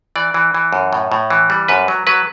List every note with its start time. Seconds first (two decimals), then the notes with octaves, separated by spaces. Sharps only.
0.16 E3 D5
0.34 E3
0.54 E3
0.73 F#2
0.93 A2
1.12 A2
1.30 E3
1.50 G3
1.68 F#2 B4
1.88 F#3
2.07 F#3 B4